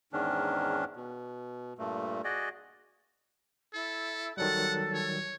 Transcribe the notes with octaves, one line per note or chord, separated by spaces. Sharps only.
E2 G#2 D#3 C#4 D4
B2
G2 A#2 A3
F#4 G#4 D5 D#5
E4 A4
D#3 F#3 G3 A4 F#5
C#5